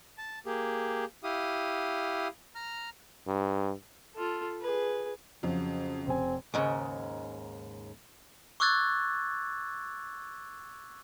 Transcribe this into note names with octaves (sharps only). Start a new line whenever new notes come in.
A5
A#3 G4 G#4
E4 G4 F5 D#6
A#5 F6
G2
F4 A4
G#4 B4
F2 C#3 F#3
F1 C4 G#5
D#2 G#2 C#3
C#6 D6 E6 F#6 G#6 A6